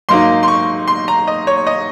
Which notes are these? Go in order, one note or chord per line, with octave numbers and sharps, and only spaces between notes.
G#2 F#3 A#3 D#4 C6
C6
C#6
C6
A#5
D#5
C#5
D#5